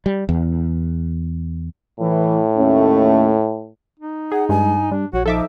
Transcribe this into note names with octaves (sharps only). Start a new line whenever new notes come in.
G3
E2
A2 E3
D#2 A3 C#4
D#4
G#4 F#5
G2 G#3 G#5
G3 D4
A#1 F#4 C#5
F3 D#4 A4 E5 D6